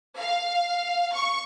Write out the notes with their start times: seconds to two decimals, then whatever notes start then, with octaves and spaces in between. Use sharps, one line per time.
0.17 F5
1.14 C#6